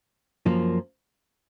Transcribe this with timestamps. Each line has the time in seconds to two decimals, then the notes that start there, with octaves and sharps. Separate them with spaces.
0.46 F#2 F3 A#3